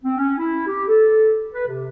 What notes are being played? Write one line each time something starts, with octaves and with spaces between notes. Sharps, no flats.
C4
C#4
E4
G4
A4
B4
C3